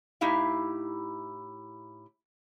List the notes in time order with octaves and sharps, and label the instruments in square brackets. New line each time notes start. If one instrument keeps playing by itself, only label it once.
[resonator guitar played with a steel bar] A2 D#4 E4 G4 F5